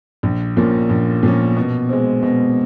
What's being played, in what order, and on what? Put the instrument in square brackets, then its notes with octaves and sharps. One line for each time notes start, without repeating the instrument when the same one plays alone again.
[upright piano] A#1
A#2 F3 A#3 C#4
A#1
A#2 F3 A#3 C#4
B2
G#3 C4
B2